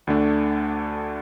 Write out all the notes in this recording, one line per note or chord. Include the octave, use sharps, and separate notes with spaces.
D2 D3 A3 D4